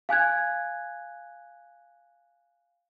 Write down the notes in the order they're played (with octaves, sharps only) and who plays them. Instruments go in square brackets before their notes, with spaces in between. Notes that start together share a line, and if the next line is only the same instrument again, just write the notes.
[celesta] F5 G#5 F#6 G#6